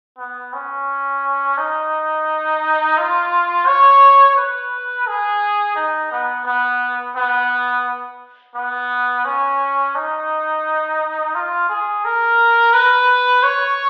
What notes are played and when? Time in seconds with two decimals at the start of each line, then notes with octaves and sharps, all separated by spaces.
0.18 B3
0.53 C#4
1.58 D#4
2.98 F4
3.67 C#5
4.36 B4
5.07 G#4
5.76 D#4
6.11 B3
6.46 B3
7.16 B3
8.55 B3
9.25 C#4
9.95 D#4
11.35 F4
11.69 G#4
12.05 A#4
12.73 B4
13.43 C#5